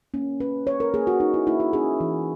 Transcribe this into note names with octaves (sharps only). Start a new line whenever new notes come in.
A#3 C#4
C#4 B4
C#4 C#5
A#4
A#3 G#4
F#4
A#3 D#4
E4
A#3 E4
F#4
C#4 G#4
E3